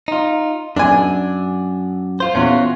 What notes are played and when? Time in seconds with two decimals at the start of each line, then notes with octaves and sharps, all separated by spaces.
0.08 D#4 F4
0.76 F#2 D4 G#5
2.20 F4 C5
2.35 E2 C#4 F4 F#4